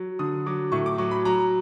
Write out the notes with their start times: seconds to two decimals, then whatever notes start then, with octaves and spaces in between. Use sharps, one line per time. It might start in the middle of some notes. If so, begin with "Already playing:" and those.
Already playing: F#3
0.19 D3 D#6
0.46 F#3 D6
0.72 A2 C#6
0.86 D6
0.98 F#3 C#6
1.11 B5
1.25 F#3 A#5